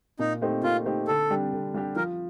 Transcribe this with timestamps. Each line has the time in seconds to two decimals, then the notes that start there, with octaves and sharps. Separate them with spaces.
0.19 A#2 D#4
0.41 A3 D#4 G4 C5
0.63 A#2 F4
0.86 A3 D#4 G4 C5
1.08 D3 A4
1.30 G3 D4 G4
1.53 D3
1.74 G3 D4 G4
1.96 F3 A#4